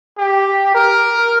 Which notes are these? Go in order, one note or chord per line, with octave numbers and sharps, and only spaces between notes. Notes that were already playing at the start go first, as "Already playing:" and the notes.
G4
A#4